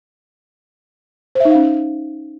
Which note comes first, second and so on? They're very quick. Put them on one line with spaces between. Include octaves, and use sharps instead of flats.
C5 E5 D#4 F5 C#4